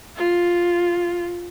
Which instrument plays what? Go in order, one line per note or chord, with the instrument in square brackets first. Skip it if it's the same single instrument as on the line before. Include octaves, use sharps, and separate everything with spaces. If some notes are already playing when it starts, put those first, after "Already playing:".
[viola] F4